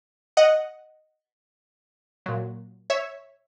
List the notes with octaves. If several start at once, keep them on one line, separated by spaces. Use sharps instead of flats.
D#5 F#5
A#2 F#3
C#5 E5